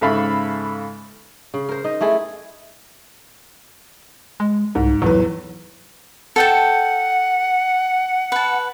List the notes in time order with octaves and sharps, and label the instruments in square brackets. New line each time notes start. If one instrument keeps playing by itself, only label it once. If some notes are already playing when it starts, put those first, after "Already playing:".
[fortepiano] G#2 C#3 A4 E5 F5 B5
[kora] C#3
A#4 C5
D#4 D#5
A3 E4 G#4
[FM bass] G#3
[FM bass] C2 [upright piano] G#2
[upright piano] E2 A2 B4 [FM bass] F#3
[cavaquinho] A4 G5 A5 [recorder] F#5
[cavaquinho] B4 A5